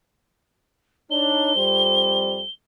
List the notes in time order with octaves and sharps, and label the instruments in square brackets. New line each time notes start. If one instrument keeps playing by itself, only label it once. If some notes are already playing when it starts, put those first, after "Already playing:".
[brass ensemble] D4 D#4 C#5 [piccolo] G7
[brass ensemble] F2 G3 C5